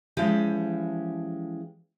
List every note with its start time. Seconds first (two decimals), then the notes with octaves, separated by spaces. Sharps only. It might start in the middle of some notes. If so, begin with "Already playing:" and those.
0.17 E3 F3 G#3 C#4 G4 A5